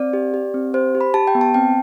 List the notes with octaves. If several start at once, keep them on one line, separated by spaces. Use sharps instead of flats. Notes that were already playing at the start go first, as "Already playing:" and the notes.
Already playing: C4 D5
G4
G4
C4
G4 C5
G4
B5
G4 A5
G5
B3
A5
C4 G5